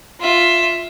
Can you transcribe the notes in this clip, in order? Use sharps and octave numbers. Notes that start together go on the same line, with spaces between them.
F4 E5